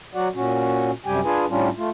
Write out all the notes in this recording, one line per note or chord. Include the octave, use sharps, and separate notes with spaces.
F#3 F#4 D5 F#5
A#2 C#4 F#4
F#2 C3 G3 G4 G5 G#5
D4 F4 G#4 B4 G#5
A2 G3 C#4 D4 F4
A3 F4